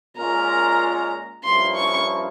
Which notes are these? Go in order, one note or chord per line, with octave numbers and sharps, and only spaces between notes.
A#2 G#3 C#4 F4 A#4 A#5
G2 F3 A#3 C#4 E4 C6
C#6